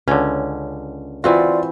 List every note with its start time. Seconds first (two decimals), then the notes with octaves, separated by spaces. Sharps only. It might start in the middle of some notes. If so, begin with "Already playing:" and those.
0.08 C#2 D3 C#4
1.24 E3 C4 F4 F#4 D5